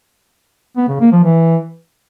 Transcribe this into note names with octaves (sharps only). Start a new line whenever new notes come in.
B3
C#3
A#3
F3
E3